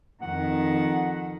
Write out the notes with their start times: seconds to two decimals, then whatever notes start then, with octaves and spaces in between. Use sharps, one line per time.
0.22 F2 D#3 F#5